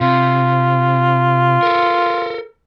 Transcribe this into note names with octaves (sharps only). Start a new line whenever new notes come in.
C3 F4
A4 A#4